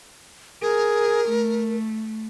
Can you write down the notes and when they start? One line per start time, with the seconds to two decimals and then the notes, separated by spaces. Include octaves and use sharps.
0.62 G#4 A#4
1.29 A3